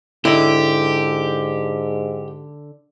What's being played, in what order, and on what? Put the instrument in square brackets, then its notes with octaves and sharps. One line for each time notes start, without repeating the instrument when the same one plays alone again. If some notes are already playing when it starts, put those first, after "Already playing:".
[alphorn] G#2 [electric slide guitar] D3 [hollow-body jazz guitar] E4 D#5 [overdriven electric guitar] G4